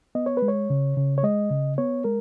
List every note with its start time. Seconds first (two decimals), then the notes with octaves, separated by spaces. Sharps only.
0.15 B3 D#5
0.26 C#5
0.37 B4
0.42 G#3
0.48 C#5
0.70 C#3
0.97 C#3
1.18 C#5
1.24 G#3 D#5
1.51 C#3
1.78 B3 C#5
2.04 G#3 A#4